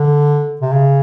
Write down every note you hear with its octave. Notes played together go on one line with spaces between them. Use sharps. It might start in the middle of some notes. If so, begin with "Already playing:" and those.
Already playing: D3
C3
C#3